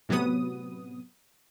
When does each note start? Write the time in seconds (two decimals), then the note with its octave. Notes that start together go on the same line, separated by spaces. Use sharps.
0.09 A2 C3 F#3 B3 D#6